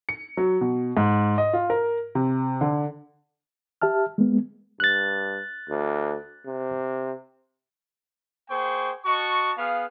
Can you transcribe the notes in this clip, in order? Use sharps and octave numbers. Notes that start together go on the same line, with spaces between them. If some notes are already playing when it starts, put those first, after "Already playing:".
C#7
F#3
B2
G#2
D#5
F4
A#4
C3
D3
G4 E5 A5 F6
G#3 A#3 B3
G2 F#6 A6
D2
C3
A#3 G#4 C5 G5 C#6
F#4 D#5 A5 C#6
B3 G#4 F5